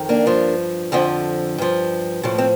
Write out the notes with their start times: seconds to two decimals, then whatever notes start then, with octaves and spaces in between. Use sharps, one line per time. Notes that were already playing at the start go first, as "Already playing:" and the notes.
Already playing: F2 D#3
0.09 A#3 D4
0.26 G2 F3
0.92 F2 D3 F3
1.58 G2 F3
2.23 A2 F3 A3
2.38 C4